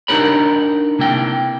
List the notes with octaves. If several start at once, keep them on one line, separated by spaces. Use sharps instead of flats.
D4 D#4 G4 A#4 C#5 B5
C3 A#3 E4 G5